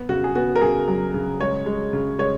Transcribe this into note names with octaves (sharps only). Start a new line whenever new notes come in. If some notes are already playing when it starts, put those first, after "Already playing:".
Already playing: B3
C#3 F#4
G#4
B3 F#4
A#4
C#3 G#4
F#3
C#3
G#3 C#5
G#3
C#3
G#3 C#5